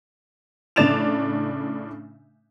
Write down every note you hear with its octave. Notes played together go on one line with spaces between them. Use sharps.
A2 C#3 D4 A6 E7 F7